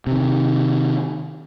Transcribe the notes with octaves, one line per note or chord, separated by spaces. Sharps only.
C3 D#3